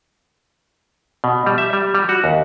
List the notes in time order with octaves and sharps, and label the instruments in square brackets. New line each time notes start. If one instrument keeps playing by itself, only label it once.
[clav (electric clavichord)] B2
G3
E5
G3
G3
F#4
D#2